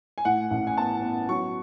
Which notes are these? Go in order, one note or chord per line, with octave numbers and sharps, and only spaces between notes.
G#5
A2 F#5
A1
G#5
B3 A5
B3
F#3 C#6